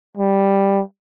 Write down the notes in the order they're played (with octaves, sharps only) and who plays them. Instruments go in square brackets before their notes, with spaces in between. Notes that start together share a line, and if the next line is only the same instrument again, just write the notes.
[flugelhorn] G3